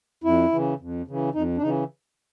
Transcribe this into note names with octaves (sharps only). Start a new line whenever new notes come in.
F2 E4
C#3 E3
F2
C#3 E3
F2 D#4
D4
C#3 E3 D#4